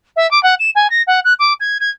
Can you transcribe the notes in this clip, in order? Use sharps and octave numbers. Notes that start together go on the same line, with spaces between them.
E5
D6
F#5
E7
G#5
A#6
F#5
F#6
D6
G#6
G#6